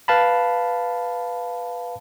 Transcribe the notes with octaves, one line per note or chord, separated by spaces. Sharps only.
B4 F5 A5 B5